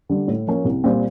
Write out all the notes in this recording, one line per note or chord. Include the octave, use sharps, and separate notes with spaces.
D3 G3
A2
F3 A#3 C#4
C2
A#2 G3 C4